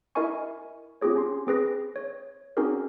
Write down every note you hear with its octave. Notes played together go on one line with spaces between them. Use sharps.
E4 A#4 D#5 E5 G#5 C#6
C4 F4 G4 G#4 C#5
C#4 C6
C4 G#4 B4 A#6
C#5
C4 C#4 D#4 F#4 G#4 A#4